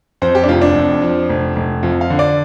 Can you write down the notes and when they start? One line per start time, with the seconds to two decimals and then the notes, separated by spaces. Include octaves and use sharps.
0.22 F2 C5
0.35 G4
0.44 D4
0.49 F1 F4
0.62 D4
0.75 F2
1.02 F3
1.29 F1
1.56 F1
1.83 F2 F4
2.01 F5
2.10 D3
2.19 D5